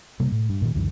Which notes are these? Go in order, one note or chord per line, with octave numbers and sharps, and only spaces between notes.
C3 G3 A#3
A2
G2
A#2 D#3
C#2 F#2 D3 E3